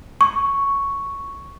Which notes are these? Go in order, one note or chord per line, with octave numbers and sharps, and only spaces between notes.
C#6